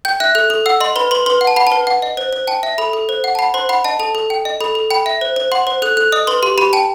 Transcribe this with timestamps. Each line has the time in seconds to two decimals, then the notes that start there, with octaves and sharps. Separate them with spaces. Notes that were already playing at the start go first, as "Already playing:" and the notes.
0.05 G5 G6
0.20 E5 F#6
0.35 A4 F#6
0.50 A4
0.66 F#5 E6
0.80 D#5 C6
0.96 B4 B5
1.11 B4 C6
1.26 B4 C6
1.41 F#5
1.47 A5
1.56 F#5 B5
1.67 B4 A5
1.87 F#5
2.02 D#5
2.17 C5
2.33 C5
2.47 G5 A5
2.63 E5
2.78 A4 B5
2.93 A4
3.09 C5
3.24 F#5
3.35 A5
3.39 F#5 B5
3.54 C5 C6
3.69 F#5 B5
3.84 D#5 A5
3.99 A4 A5
4.15 A4
4.30 G5
4.45 D#5
4.60 A4 B5
4.75 A4
4.91 G5 B5
5.06 E5
5.21 C5
5.36 C5
5.52 F#5 C6
5.67 C5
5.82 A4 F#6
5.97 A4 F#6
6.12 D#5 D#6
6.27 B4 C6
6.42 G4 C6
6.58 G4 B5
6.73 G5 A5